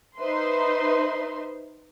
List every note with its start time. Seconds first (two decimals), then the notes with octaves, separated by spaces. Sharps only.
0.19 D#4 B4 C5 E5 C6